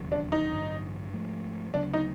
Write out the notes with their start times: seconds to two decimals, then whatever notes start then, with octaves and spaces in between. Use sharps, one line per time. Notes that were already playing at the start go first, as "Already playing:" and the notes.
Already playing: E1 D#2 C#3 F#3
0.12 D4
0.32 D#4
0.53 A1 G2 D3 F#3
1.12 G#2 F3 A3
1.73 D2 C#3 F#3 B3 D4
1.93 D#4